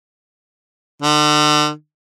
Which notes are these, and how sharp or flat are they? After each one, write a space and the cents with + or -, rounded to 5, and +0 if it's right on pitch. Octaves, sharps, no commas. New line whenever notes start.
D3 +40